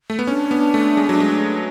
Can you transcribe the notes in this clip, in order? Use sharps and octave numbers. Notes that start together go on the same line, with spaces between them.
A3
B3
C#4 D4
B3
A3
G#3
F#3
G#3